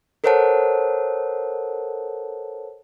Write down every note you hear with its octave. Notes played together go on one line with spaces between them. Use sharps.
A4 A#4 C5 C#5 F#5 A5